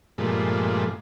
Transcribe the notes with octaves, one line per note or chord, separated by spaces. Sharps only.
G2 A#2 F3 G#3 A3